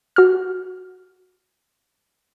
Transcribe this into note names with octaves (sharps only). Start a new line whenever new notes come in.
F#4 F6